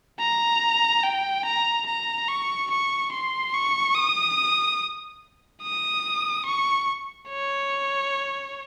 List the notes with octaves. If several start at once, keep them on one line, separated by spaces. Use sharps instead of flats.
A#5
G5
A#5
A#5
C#6
C#6
C6
C#6
D#6
D#6
C#6
C#5